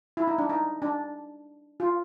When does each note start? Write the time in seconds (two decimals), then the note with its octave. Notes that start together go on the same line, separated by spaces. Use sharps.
0.17 E4
0.28 D#4
0.38 D4
0.50 D#4
0.82 D4
1.80 F4